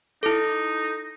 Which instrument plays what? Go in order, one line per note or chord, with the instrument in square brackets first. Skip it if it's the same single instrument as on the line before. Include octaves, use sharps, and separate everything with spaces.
[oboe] D#4 [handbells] E4 A4